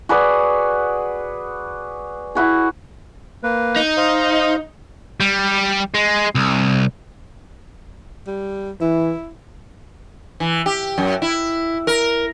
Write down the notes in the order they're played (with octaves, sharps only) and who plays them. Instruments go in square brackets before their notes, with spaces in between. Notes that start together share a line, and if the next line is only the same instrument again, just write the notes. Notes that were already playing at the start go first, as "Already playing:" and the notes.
[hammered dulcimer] F#4 G#4 B4 D5
E4 F#4 G#4
[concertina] A#3 B4
[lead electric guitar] D#4
[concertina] C5 D#5 F5
[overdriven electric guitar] G3
G#3
C2
[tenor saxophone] G3
[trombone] E3 [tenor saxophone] E4
[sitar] E3
G4
F#2
E4
A#4